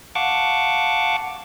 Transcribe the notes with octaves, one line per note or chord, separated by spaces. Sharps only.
F5 F#5 A5 C#6 D6